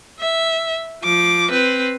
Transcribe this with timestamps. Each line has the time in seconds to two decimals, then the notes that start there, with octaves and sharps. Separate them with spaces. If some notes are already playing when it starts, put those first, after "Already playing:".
0.20 E5
1.03 F3 D6
1.51 C4 B4